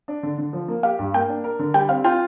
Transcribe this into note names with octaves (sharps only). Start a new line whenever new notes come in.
D4
D3
D3
F3
A#3
G4 F5
G2
A#3 G5
D4
A#4
D3
G3 G5
C4 F5
F4 G5